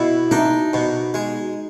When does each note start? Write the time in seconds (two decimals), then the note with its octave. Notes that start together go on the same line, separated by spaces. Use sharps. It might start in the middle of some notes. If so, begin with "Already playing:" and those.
Already playing: B2 E4
0.31 D4 D#4
0.73 B2
1.14 G#3